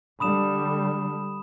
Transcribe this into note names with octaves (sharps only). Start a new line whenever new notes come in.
D3 G3 B5 D#6 E7